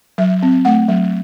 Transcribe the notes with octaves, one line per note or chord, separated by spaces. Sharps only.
F#3 E5
C4
A3 F#5
F#3